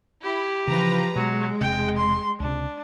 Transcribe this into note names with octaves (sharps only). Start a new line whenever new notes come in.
E4 G4
C#3 E3 F3 B4 A#5
B2 F#3 G#3
E1 C3 G5
C6
C#2 C3 D4